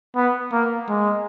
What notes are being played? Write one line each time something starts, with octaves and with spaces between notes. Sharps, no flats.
B3
A#3
G#3